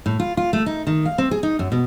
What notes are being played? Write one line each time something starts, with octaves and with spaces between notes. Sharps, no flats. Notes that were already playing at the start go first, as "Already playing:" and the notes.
A2
F4
F4
A3
D#4
D#3
F5
C4
G#4
D#4
F#2
B2